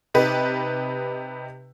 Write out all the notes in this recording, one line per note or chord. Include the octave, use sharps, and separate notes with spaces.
C3 D#4 G4 B4